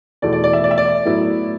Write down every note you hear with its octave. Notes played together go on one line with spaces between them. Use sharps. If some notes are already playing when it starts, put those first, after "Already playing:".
E2 B2 A3 E4 D5
D5
D5
E5
D5
E5
D5
A2 F#3 B3 E4